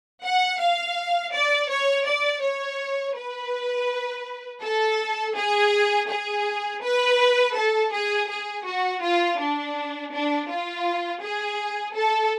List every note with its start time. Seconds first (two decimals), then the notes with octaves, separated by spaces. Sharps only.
0.23 F#5
0.59 F5
1.33 D5
1.69 C#5
2.06 D5
2.42 C#5
3.16 B4
4.63 A4
5.36 G#4
6.09 G#4
6.82 B4
7.56 A4
7.92 G#4
8.29 G#4
8.66 F#4
9.02 F4
9.39 D4
10.12 D4
10.49 F4
11.22 G#4
11.96 A4